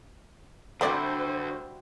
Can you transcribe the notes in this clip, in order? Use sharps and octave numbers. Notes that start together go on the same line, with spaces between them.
D2 G3 A3 C4 E4 F#4 C5 D5